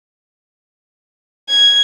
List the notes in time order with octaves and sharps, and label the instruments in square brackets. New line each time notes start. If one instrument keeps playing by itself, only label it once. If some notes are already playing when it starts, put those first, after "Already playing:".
[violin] G#6